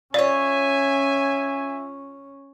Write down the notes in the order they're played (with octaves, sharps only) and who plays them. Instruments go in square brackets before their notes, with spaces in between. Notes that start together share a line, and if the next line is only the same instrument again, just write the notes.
[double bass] C#4 [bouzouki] F4 C#5 [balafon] D5 [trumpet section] E5 G#5